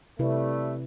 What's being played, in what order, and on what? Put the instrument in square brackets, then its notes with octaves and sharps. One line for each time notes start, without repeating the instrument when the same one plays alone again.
[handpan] C3 E4 B4 [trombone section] G3 A3